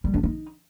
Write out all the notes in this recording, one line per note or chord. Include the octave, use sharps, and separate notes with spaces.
G3
D4
D#4